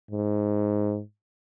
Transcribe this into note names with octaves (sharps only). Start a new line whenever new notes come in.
G#2